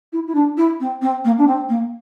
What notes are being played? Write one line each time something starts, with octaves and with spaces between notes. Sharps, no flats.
E4
E4
D4
E4
C4
C4
A#3
D4
C4
A#3